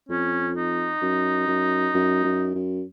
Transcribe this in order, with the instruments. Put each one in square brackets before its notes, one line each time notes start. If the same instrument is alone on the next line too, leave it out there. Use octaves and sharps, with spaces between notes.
[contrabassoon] F2 [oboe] C#4
[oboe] D#4
[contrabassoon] F#2
F#2
F#2
F#2
F#2